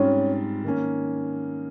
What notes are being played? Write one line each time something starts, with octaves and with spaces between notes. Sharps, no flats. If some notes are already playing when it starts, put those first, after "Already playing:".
Already playing: G#2 G3 C4 C#4 F4
D#3 A#3 C#4